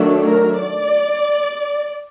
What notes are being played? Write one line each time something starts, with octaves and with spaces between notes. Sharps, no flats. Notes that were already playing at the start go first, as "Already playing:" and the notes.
Already playing: D#3 F#3 A3 D4
A#4
D5